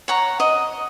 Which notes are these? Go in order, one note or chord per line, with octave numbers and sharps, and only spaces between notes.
C#5 F#5 A#5
D#5